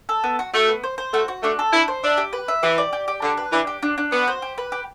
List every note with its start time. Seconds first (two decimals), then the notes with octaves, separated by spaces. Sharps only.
0.09 A4
0.24 B3
0.39 F#4
0.54 A3 F#4
0.69 B3
0.84 C5
0.98 C5
1.13 A3 F#4
1.28 F#4
1.43 A3 D4
1.59 A4
1.73 D4 E4
1.88 C5
2.04 D4 E5
2.17 G4
2.33 B4
2.48 E5
2.63 E3 G4
2.78 D5
2.93 G4
3.08 G4
3.22 D3 D4
3.37 B4
3.52 E3 D4
3.67 G4
3.83 D4
3.98 D4
4.12 B3 F#4
4.28 C5
4.42 G4
4.58 B4
4.72 G4